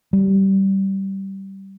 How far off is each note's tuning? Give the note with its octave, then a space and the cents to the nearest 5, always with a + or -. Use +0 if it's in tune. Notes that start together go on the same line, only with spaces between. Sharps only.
G3 -15